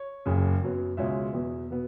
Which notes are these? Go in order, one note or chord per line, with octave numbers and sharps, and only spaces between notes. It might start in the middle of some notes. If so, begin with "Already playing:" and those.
Already playing: C#5
F#1 F#2 C#3
F#2 F#3 B3
C#2 B2 G#3 C#4 E5
E2 B2 B3
B2 B3